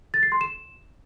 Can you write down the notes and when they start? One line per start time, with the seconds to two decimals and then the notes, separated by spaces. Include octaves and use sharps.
0.14 A6
0.23 C7
0.32 C6
0.41 E7